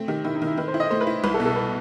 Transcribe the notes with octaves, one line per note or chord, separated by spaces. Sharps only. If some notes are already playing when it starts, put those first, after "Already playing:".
Already playing: A3 C4
D#3 G4
D#3 E4
D#4
D#3 E4
D#3 B4
C5
E4
D#5
A3 C5
B4
E4
C2 B4
A4
B2
A4
B4